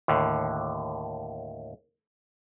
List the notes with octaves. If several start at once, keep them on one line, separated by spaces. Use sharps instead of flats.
D#2 A2 D3